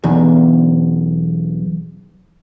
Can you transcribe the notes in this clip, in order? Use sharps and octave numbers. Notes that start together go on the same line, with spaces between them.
B1 E2